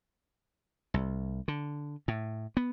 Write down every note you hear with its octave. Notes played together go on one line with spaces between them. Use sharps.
C2
D3
A2
B3